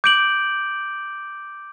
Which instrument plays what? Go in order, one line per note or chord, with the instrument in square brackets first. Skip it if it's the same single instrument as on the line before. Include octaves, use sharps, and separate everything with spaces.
[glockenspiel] D6 G6 D7 F#7